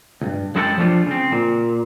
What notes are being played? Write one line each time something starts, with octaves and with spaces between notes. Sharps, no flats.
C#2 G2
F#2 G#3 E4 F#4 G4 A4
F3 G3 A3 D4 F4
C#3 C4
A#2